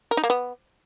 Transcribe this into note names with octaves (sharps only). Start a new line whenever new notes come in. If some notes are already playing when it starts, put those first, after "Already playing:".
A#4
D#4
A#3
B3